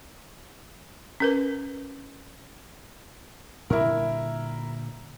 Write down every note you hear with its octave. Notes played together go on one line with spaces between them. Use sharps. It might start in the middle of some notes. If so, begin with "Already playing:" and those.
C#4 A#4 B4
A#2 D3 G3 E4 A#4